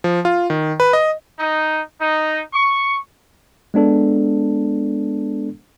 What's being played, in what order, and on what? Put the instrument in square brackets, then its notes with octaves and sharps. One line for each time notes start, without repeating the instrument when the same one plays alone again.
[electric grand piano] F3
F4
D#3
B4
D#5
[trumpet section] D#4
D#4
C#6
[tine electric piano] G#3 B3 D4 A4